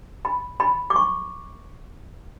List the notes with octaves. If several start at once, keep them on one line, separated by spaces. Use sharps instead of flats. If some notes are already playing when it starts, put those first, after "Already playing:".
B5
B5
D6
C#6